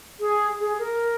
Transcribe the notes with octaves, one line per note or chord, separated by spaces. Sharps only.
G#4
G#4
A#4